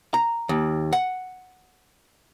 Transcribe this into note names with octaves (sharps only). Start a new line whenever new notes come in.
A#5
D#2
F#5